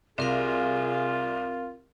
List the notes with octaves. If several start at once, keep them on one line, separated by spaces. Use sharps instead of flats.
C2 C4 F4 G#4 A#4 F5